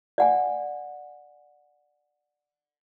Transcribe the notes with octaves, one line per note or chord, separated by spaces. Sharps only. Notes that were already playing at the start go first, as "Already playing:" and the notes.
D5 F#5 G#5